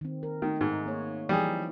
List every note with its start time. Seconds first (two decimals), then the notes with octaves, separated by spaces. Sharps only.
0.01 D#3 C4
0.23 A#4
0.42 D#3 A3 D#4
0.61 G#2 D#4 G#4
0.86 A#3 C#5
1.29 E3 F3 G3 D#4 G#4